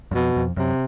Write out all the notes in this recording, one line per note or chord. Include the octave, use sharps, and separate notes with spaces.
F#2
F2 B2
F2
F#2 C3